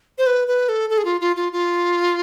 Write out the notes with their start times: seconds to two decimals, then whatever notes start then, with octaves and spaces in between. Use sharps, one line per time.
0.18 C5
0.27 B4
0.48 B4
0.69 A4
0.90 A4
0.98 G#4
1.05 F4
1.21 F4
1.36 F4
1.52 F4